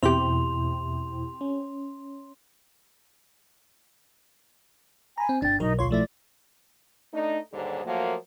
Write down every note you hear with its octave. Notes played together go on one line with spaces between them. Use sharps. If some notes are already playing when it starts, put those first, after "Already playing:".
E2 B2 C4 E4 G4 C6 F7
C#4
G#5 A#5 B5
C4
G1 D4 G5 A6
B1 F#3 D#4 A#4
D2 F4 C#5 C6
F3 A3 E4 D5
A3 D4 D#4
D#2 G#2 D3 G3 G#4
F3 F#3 A3 A#3